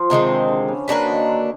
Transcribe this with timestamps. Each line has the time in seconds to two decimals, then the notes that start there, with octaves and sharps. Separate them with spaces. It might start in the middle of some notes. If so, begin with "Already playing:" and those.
Already playing: F3
0.10 C3 D#3 G#3 C4
0.29 D3
0.48 D3
0.68 C#3
0.88 A#3 D4 F#4 B4
1.07 D#3
1.26 D3